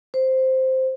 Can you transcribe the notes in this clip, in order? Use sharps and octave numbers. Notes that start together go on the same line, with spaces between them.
C5